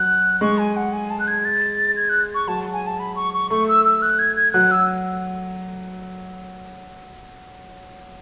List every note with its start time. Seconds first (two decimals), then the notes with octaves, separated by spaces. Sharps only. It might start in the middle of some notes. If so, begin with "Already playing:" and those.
Already playing: F#3 F#6
0.41 G#3 C#6
0.58 G#5
0.77 F#5
0.93 G#5
1.10 A5
1.20 F#6
1.28 G#6
1.45 A6
1.96 G#6
2.09 F#6
2.35 C#6
2.47 F#3 A5
2.73 G#5
2.87 A5
3.00 B5
3.16 C#6
3.34 C#6
3.50 A3 C#6
3.69 E6
3.85 E6
4.02 F#6
4.19 G#6
4.36 G#6
4.53 F#3 F#6
4.71 E6